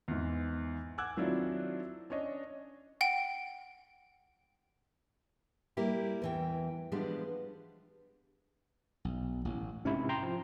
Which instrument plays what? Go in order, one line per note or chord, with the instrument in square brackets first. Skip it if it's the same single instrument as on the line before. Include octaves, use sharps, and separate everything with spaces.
[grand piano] E2 G#2
F#5 G#5 D6 E6 F#6 G#6
D#3 F#3 C4 D4 E4 F4
C#4 D4 C#5 D#5
[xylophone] F#5 G5
[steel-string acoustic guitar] G3 A#3 E4 G4
E2 E3 G5
E3 F3 G3 G#3 B3 D4
[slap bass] B1
A1
[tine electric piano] G#2 C3 E4 [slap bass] C#4
[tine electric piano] G5 A#5 C6
F3